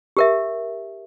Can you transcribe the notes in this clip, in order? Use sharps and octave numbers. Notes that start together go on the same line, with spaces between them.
G4 A#4 E5